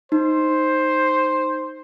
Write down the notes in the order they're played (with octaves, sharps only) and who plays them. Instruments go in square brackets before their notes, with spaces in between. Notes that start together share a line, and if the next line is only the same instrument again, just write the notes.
[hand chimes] D#4 [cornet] C5